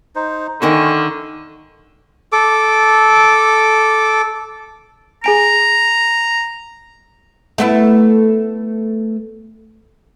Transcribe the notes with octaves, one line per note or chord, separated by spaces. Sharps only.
D#4 C5
D3 D#3 A#4 E5 G#5 C#6
A4 D6
G#4 G#5 A#5 D7
A3 B3 E4